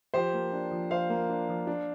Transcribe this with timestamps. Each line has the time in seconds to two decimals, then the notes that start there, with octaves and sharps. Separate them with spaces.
0.14 F3 G4 C5
0.34 A#3
0.53 D4
0.71 F3
0.91 F3 C5 F5
1.10 A#3
1.29 D4
1.49 F3
1.67 D4